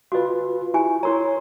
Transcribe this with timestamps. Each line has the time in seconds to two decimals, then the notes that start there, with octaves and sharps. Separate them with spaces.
0.12 F4 F#4 B4 D#5
0.74 E4 G4 G#5
1.03 E4 A#4 C#5 A#5 C6